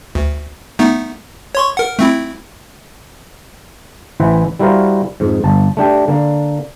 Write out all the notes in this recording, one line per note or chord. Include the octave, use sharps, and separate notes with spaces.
D2
A3 B3 D#4
C#5 C6 C#6
A#4 F#5
A3 C4 E4
A1 E3 E4 C5 E5 F#5
G3 E4 F#4 A#4 C5 F5
F2 G#2
G1 A5
A3 D4 G4
D3 A#3